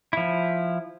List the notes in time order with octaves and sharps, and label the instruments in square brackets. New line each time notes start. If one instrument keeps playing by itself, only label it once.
[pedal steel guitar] F3 E4